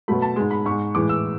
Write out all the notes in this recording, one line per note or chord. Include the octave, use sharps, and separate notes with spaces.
B2 F#3 A3 B5
A5
G#2 G#3
B5
G#2 G#3 C#6
A2 E3 G#3 D6
E6